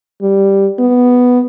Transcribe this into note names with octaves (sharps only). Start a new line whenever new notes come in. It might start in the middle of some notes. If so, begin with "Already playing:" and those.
G3
B3